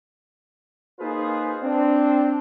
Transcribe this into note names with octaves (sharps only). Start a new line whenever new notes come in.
A#3 D#4 F4 G#4 B4 C5
C4 D4